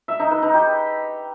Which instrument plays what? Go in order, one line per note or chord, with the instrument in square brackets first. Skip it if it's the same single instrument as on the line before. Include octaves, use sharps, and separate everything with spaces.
[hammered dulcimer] E5
D#4
B4
D#4
G4